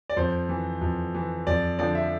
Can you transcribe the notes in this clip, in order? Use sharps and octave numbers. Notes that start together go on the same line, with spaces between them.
D5
F2 C5
E3
F2
E3
F2 D5
D3 F3 D5
E5